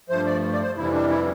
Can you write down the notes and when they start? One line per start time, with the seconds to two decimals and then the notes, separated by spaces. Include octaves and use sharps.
0.09 G2 F3 A3 C5
0.26 D5
0.53 D5
0.60 C5
0.76 F2 C3 E3 G3 E4
0.93 D4
1.10 E4